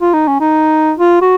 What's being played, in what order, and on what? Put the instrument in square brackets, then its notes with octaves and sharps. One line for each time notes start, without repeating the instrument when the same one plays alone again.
[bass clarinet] F4
D#4
C#4
D#4
F4
F#4